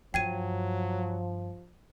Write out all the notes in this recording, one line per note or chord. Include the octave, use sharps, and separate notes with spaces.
G2 F3 F#3 G5 G#6 D#7